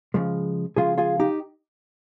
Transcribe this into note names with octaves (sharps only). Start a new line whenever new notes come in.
C#3 F3 G#3
C#3 F3 G#3 F4 G#4
F4 G#4
D#4 G4